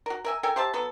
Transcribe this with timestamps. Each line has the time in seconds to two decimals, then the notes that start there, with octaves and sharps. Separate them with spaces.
0.06 F#4 A#4
0.25 A#4 E5 G#5
0.43 A4 A#4 G5 G#5
0.56 G4 C5 E5 A5
0.73 F#3 B3 A4